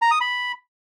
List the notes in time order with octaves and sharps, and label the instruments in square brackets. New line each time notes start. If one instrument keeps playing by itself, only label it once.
[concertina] A#5
D#6
B5